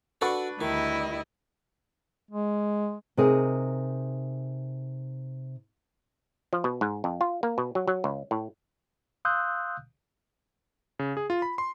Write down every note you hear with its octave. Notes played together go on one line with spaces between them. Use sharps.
D4 F#4 A4 B4 C#6
D2 D#3 G3 E4 D#5
G#3
C3 D#4 G#4 A#4
F3
B2
G#2
F2
F4
A#3
B2
F#3
F#3
C#2
A2
F5 C6 D#6 E6 F#6 G6
C#3
G#4
F4
B5
C6